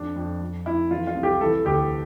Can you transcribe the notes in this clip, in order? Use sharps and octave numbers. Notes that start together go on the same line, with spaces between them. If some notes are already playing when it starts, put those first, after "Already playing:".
Already playing: F2 D4
F2
F2
F2 E4
E3 F4
F4
C2
G4
E3 A4
D2 G4